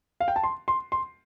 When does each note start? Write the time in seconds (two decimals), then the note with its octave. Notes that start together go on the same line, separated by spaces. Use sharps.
0.20 F5
0.28 G5
0.36 A5
0.44 C6
0.68 C6
0.92 C6